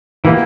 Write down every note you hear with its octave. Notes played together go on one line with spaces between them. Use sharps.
B2 E3 A#3 E4 G4